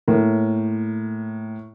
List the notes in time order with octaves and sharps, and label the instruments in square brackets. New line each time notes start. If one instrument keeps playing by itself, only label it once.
[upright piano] A2 A#3